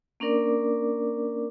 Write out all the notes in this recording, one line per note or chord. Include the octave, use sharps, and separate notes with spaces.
A#3 C#4 D4 A#4 D5 D6